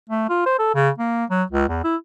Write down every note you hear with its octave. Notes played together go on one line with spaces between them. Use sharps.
A3
F4
C5
A4
C#3
A#3
F#3
C#2
E2
E4